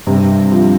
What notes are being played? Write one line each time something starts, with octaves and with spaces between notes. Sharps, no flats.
G2 C3
F3